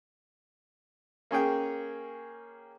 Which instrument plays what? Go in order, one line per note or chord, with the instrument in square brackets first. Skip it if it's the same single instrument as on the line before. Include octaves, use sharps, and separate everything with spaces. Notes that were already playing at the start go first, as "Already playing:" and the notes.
[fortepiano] A#3 C#4 G#4 G5